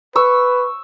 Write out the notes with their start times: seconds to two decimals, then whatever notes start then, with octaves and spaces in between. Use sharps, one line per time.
0.15 B4 C#6 E6